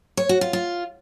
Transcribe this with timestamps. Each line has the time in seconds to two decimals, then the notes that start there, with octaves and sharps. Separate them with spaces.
0.17 C#5
0.29 F#4
0.41 F4
0.53 F4